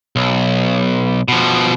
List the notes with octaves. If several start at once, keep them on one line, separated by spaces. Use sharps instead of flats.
B1
B2 F3